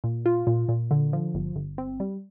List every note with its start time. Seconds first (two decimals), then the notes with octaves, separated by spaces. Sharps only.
0.04 A#2
0.26 F4
0.47 A#2
0.69 A#2
0.91 D3
1.13 F3
1.34 G1
1.56 G1
1.78 C4
2.00 G3